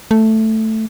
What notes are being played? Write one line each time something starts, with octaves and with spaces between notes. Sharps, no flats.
A3